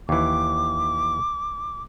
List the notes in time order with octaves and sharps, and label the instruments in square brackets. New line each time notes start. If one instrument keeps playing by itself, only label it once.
[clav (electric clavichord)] D#2 E3 [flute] D6